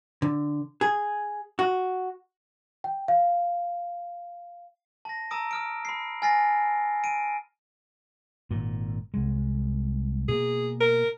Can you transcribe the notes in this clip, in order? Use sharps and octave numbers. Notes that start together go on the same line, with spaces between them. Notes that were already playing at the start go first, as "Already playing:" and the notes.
D3
G#4
F#4
G5
F5
A5 A#6
A5 A#5 D#6 E6 D7
D#6 F6 D7
B5 C7
G#5 F6 A6 A#6 C7
D7 D#7
G#1 A#2
C2 G#3
B2 A#3 G#4
A#4